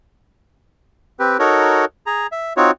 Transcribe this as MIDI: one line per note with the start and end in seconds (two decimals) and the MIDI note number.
1.19 1.37 60
1.19 1.37 67
1.19 1.37 71
1.39 1.85 63
1.39 1.85 66
1.39 1.85 69
1.39 1.85 70
1.39 1.85 73
2.06 2.27 68
2.06 2.27 82
2.32 2.53 76
2.57 2.71 60
2.57 2.71 63
2.57 2.71 65
2.57 2.71 66
2.57 2.71 73